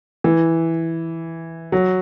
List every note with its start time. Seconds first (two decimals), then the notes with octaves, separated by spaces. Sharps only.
0.24 E3
1.72 F#3